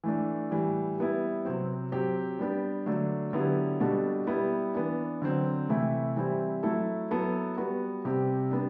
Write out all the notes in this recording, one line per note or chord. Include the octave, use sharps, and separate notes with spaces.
E3 A3 D4
A2 E3 G3
G3 B3 E4
C3 F#3 C4
F#3 C4 G4
G3 B3 D4 G4
D3 F#3 A3 D4
D3 F#3 B3 E4 G4
B2 G3 D4 F#4 A4
G3 B3 E4
E3 B3 D4
D3 F#3 C4
C3 E3 A3 E4
E3 G3 C4 E4
F#3 A3 E4 A4
F#3 B3 E4 A4
G3 B3 F#4
C3 G3 C4 G4
G3 B3 D4